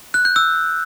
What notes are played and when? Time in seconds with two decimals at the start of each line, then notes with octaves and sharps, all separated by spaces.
0.14 F#6
0.25 G6
0.36 E6